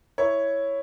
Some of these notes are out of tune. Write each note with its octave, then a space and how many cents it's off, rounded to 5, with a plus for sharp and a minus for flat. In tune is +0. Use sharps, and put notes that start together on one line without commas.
E4 +0 C#5 +0